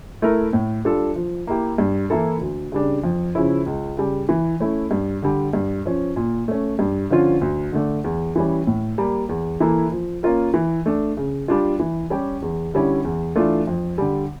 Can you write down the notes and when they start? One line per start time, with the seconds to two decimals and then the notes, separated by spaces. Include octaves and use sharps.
0.22 A3 E4 A#4
0.53 A2
0.85 G3 D4 F4 A4
1.16 F3
1.47 A#3 E4 G4
1.78 G2
2.10 E3 A#3 E4 A4
2.41 D2
2.72 C#3 G3 D4
3.04 F2
3.35 C#3 F3 C#4 E4
3.66 C#2
3.97 C#3 G3
4.29 E3
4.60 A3 C#4 E4
4.91 G2
5.22 D3 G3
5.53 G2
5.86 F3 C#4
6.16 A#2
6.48 A3 C#4
6.79 G2
7.10 D3 F3 C#4 F4
7.41 D2
7.72 D3 A3 D4
8.04 E2
8.36 E3 G3 C#4
8.67 A2
8.98 G3 A#3
9.29 E2
9.60 E3 A#3 E4 A4
9.92 F3
10.23 A#3 C#4 F4 A#4
10.54 E3
10.86 A3 D4
11.17 C#3
11.48 G3 D4 F4
11.80 E3
12.10 G3 C#4 G4
12.42 E2
12.74 D3 G3 C#4 E4
13.05 E2
13.36 E3 A3 D4 F4
13.67 F2
13.98 D3 G3